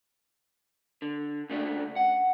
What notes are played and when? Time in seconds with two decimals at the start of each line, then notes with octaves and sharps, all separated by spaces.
1.02 D3
1.50 C#3 A3 D4
1.96 F#5